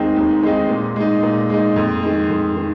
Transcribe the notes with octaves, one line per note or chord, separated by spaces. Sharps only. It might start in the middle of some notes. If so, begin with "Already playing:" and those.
Already playing: D#2 D#3 G#3 C4 D#4
D#2
D#3 G#3 C4 D#4
A#2
G#3 D#4
A#2
G#3 D#4
F2
D#3 G#3
F2
D#3